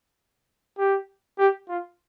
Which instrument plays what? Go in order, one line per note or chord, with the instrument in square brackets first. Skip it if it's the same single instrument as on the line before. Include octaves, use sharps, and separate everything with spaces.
[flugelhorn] G4
G4
F4